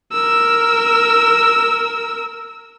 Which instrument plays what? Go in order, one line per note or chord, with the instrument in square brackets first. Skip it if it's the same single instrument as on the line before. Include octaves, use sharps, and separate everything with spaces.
[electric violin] A#4 E6